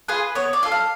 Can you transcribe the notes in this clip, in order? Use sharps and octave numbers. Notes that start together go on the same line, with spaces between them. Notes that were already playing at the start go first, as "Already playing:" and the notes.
F4 G#4 B4
B3 C#5
D5
F4 A4
F5